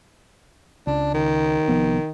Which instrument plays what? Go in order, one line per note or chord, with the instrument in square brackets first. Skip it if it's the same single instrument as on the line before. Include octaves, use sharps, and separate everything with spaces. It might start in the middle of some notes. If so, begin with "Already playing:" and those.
[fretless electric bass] C#2 [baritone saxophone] D4
[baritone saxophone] D#3
[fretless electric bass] C2 F3 B3